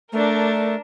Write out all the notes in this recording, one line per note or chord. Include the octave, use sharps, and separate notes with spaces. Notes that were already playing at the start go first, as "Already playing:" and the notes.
A3 D4 A#4